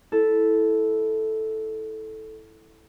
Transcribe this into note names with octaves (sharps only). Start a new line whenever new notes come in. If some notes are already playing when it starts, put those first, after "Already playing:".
E4 A4